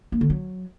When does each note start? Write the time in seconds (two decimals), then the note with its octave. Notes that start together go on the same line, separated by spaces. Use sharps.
0.12 A#3
0.21 D3
0.30 F#3